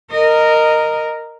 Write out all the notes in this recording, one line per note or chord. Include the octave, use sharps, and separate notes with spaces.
A#4 D#5